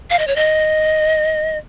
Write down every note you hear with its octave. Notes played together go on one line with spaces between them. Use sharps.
F5
D#5
C#5
D#5